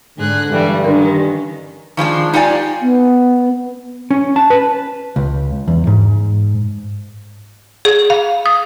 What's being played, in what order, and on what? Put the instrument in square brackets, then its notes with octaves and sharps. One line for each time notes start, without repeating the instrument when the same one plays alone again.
[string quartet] G#2 G#4 F#6 [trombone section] D3
[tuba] G2 [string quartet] E3 G3 A3
[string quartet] D#3 C#4 [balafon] D4 A#4
[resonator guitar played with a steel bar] D#3 F3 G#3 D4
D#4 F4 G4 D5 G#5
[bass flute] B3
[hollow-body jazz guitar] C#4
A5
B4
C#2
E2
G#2
[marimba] G#4
F5
D#6